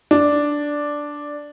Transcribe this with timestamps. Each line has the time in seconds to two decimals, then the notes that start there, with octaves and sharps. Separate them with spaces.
0.11 D4